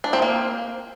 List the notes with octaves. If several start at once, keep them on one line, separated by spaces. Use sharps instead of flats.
D4
C4
A#3